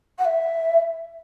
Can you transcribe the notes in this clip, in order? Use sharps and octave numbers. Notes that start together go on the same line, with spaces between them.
F#5
E5